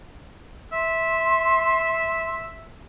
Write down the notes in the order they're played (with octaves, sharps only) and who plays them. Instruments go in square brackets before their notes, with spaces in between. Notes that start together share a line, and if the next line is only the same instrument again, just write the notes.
[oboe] E5 [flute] C6